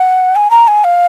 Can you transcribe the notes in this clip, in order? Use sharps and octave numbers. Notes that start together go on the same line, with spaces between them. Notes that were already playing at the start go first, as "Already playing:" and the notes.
Already playing: F#5
G#5
A#5
G#5
F5